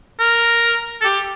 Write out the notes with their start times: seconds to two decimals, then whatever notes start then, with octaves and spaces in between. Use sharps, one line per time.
0.20 A#4
1.01 A4
1.05 G4